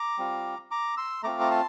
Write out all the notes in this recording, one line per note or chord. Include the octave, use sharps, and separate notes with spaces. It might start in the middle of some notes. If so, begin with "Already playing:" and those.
Already playing: A#5 D6
G3 C4 F4
A#5 D6
C6 E6
A3 C4 F4 A#5 D6
A#5
A5 C6